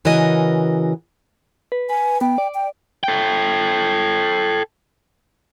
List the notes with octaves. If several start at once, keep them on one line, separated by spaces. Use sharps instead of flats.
C#3 E3 F#4 A#4 D#5 G#5
B4
B4 G#5
B3 G5
D5
G5
A4 G5